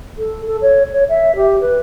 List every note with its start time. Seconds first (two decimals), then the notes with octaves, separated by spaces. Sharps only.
0.18 A4
0.47 A4
0.62 C#5
0.93 C#5
1.09 E5
1.36 G4
1.61 B4